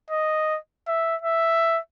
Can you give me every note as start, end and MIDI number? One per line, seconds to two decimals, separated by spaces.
0.10 0.58 75
0.87 1.16 76
1.21 1.79 76